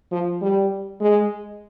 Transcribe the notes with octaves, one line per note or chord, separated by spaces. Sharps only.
F3
G3
G#3